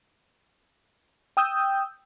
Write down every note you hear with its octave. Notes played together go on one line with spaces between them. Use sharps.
G5 D#6 E6 G6